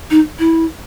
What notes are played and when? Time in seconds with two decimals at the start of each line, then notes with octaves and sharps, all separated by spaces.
0.10 D#4
0.39 E4